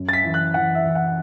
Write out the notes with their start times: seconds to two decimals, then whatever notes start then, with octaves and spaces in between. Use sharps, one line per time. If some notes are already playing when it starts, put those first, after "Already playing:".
Already playing: F#2
0.09 A6
0.13 B6
0.24 E3
0.34 F#6
0.54 E3 F#5
0.75 E5
0.85 E3
0.95 F#5